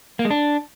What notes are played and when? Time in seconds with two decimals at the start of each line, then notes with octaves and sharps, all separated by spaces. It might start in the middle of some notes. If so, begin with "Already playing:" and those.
0.19 A#3
0.25 G#3
0.31 D4